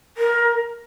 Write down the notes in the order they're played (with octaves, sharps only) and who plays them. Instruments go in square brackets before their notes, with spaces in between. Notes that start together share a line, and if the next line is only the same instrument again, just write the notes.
[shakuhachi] A#4